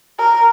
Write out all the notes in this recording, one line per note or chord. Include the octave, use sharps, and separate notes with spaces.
A#4